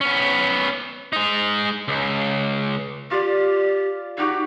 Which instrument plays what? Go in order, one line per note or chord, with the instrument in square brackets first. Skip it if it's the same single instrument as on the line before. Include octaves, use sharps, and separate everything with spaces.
[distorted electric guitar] B3 C#4
G#3 D#4
C#2
[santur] F4 D5 [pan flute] G4
[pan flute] D#4 [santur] F#4 G4 F#5